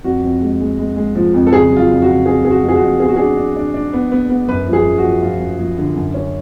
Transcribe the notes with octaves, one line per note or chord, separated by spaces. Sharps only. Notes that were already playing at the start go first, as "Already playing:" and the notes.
F2 F#4
F2
G#3
G#3
G#3
G#3
F3
F2
A4
C#3 G#4
F#3
F4
F2
F#4
C#3
F2 G#4
F2 G#4
F#4
F2
G#4
F#4
F2
B3 G#4
F#4
D4 G#4
D4
D4
D4
B3
B3
B3
F#2 B4
F3
G#4
F#2
F#4
F3
F3 F4
F#2
F3
D3
F#2
C#4